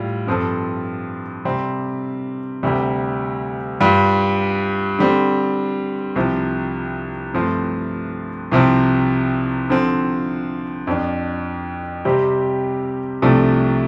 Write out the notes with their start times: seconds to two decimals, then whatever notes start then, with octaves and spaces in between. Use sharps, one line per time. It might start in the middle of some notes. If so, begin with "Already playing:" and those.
Already playing: A2 G3 F4
0.27 G2 F3 C4 A4
1.45 C3 G3 C4
2.63 D2 C3 G3
3.80 G2 G3 F4
4.99 D3 G3 C4
6.16 C2 C3 F3
7.34 G2 F3 A3 C4
8.52 C2 C3 F3 C4
9.69 D3 F3 C4
10.87 F2 F3 D4
12.05 C3 G3 C4 G4
13.22 C2 C3 F3 A3 D4